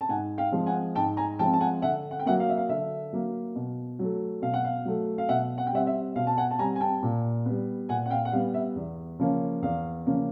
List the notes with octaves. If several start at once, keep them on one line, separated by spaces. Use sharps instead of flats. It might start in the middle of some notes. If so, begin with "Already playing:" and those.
A5
G#2 F#5 G#5
F5 G5
F3 G#3 C4
F#5 G#5
G#2 G5 A5
G#5 A#5
F3 G#3 C4 G5 A5
A5
F#5 G#5
D3 E5 F#5
F#5
G5
F#3 A#3 E5 F#5
F5
E5
F5
D3 E5
F#3 A#3
B2
F#3 A3
B2 F5
F#5
F5
F#3 A3
F5
B2 E5 F#5
F#5
G5
G3 C4 E5 F#5
E5
B2 F5
A5
F#5 G#5
A5
G3 C4 G#5 A#5
G#5
G5 A5
A#2
G3 B3
A#2 F#5 G#5
F#5
F5 G5
F#5
G3 B3 F5
E5
E2
C#3 F3 A#3 C#4
E2 F5
C#3 F3 A#3 C#4